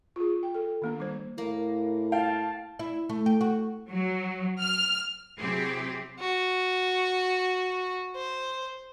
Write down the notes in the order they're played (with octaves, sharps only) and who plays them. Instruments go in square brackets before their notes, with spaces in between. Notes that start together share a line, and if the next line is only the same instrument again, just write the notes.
[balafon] F4 G#4
G5
A4
D#3 A#3 D4
G3 C5
[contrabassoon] A2 [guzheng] A#3
[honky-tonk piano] F5 G5 [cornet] A5
[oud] E4
A3
G4
F#4
[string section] F#3
F6
[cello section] C3 F#3 C4 E4 G4 G#4
[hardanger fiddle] F#4
C5